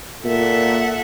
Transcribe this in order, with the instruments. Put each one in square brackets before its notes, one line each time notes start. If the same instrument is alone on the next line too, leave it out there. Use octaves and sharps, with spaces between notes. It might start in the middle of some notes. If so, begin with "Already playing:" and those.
[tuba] A#2 [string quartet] A4 E5 F#5